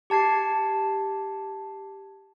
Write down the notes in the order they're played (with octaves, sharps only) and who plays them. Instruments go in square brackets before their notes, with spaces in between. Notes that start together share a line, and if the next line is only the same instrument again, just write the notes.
[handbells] G4 A5 G#6 C7